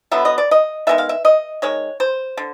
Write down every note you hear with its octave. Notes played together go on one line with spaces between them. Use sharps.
D3 F#3 B3 E5
D#5
D5
D#5
D#3 G#3 B3 E5
F5
E5
D#5
D#3 G#3 C#5
C5
D3